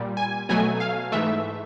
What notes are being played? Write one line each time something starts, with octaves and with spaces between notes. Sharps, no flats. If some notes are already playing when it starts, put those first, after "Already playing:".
Already playing: A#2 G3
G#5
B2 F#3 A3 G#5
F5
G#2 E3 A3 E5